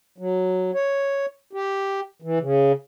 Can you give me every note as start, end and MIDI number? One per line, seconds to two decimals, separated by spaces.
0.18 0.71 54
0.74 1.26 73
1.53 2.00 67
2.22 2.39 52
2.40 2.72 49